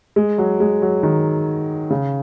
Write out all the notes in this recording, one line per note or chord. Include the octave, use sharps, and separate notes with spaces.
G#3
F#3
G#3
F#3
D#3
C#3